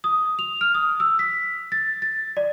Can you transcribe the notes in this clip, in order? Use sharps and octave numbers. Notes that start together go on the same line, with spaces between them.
D#6
F7
F6
D#6
E6
B6
A6
A6
D5